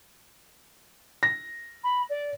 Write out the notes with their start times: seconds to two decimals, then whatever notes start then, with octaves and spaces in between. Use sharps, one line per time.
1.23 A#6
1.84 B5
2.10 D5